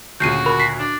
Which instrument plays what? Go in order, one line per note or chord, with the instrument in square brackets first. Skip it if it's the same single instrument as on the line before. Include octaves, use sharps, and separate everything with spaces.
[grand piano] D2 A#2 C#3 [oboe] F#4 [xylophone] G6 C7 D#7
[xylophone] A#4 B5
B6 C7
[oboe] D4